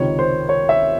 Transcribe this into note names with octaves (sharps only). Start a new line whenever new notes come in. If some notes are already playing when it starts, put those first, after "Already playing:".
Already playing: C#2 C3 D#3 C#5
C5
C#5
E5